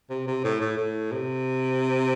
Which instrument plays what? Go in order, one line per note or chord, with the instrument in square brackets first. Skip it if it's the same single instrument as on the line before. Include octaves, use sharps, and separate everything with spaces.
[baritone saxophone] C3
C3
A2
A2
A2
C3